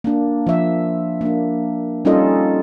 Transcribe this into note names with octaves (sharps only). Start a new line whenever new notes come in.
A#3 D4
F3 E5
A#3 D4
G3 C#4 D#4 F4 A4 D#5